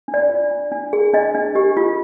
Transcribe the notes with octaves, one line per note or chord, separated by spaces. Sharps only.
D4
D5
F4
D4
D4
G#4
D4 D#5
D4
G4
F4